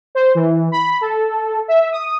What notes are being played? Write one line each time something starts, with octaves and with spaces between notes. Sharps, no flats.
C5
E3
B5
A4
E5
D#6